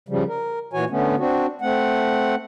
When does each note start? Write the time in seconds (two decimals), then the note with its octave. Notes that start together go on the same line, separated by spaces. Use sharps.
0.09 C#3 F3 G3
0.28 A#4
0.73 A#2 E3 F#4 C#5 G#5
0.90 D3 A3 B3 C#4
1.18 C4 D4 F#4
1.61 A3 C4 F#5